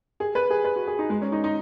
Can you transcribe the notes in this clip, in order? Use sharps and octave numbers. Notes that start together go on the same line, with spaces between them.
G#4
B4
G#4
B4
F#4
G#4
D#4
G#3
C#4
D#4
D#4